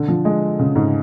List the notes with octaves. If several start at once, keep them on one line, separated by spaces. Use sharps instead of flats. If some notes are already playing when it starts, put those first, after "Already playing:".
Already playing: D3
F3
G#3
C#3
G#2